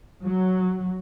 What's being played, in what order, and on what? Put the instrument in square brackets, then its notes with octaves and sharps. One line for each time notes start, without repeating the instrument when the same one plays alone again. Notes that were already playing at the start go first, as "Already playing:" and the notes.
[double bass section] F#3